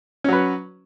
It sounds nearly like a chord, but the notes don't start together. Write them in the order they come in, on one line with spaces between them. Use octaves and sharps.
C#4 F#3 B4